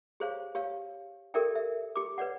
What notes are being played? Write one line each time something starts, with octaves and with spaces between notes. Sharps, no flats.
G4 G#4 C5 C#5 F5
G4 C#5 F5
G4 A4 A#4 D5 E5 G5
E5
G4 D6
B4 C#5 D5 F#5